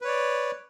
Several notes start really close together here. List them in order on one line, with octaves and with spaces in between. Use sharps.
B4 C#5 D5